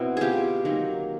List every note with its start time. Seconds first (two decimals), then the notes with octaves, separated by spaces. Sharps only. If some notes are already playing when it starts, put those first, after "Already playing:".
Already playing: B2 C4 E4 F#4
0.17 F4 G4 G#4
0.65 D#3 F#3 A#3